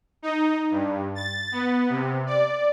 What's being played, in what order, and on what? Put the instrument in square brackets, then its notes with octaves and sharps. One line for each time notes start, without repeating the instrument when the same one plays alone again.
[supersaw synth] D#4
G2
A6
B3
C3
D5